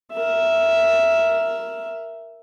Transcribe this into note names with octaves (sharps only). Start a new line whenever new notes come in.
A#4 E5